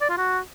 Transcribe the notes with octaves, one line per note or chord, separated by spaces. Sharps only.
D5
F4
F#4